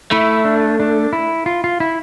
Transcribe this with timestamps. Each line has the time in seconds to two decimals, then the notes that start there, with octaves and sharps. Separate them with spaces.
0.11 A3 E4
0.45 D4
0.80 D4
1.13 E4
1.46 F4
1.64 F4
1.80 E4